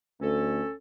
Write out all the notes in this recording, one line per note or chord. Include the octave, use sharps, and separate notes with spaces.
D2 C#4 A4